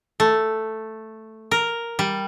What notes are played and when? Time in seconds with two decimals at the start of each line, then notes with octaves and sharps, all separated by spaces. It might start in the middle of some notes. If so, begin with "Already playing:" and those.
0.20 A3
1.51 A#4
1.99 G3